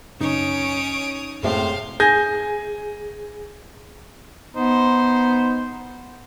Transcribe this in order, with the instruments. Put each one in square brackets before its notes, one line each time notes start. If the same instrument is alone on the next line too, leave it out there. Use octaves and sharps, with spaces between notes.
[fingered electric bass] F#2 C#3 [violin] C#4 D7 [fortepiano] D#4 [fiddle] C#5 D#6
[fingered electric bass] F#2 C4 [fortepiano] A2 C3 G#3 [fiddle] C5 [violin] F5
[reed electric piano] G#4 [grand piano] G#5 G6 A#6
[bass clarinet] B3 [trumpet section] D#4 C5